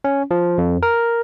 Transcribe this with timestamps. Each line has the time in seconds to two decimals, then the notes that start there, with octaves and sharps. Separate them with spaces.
0.04 C#4
0.31 F3
0.58 F2
0.83 A#4